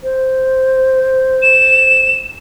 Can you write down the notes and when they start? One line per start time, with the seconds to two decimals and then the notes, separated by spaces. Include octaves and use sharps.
0.03 C5
1.42 E7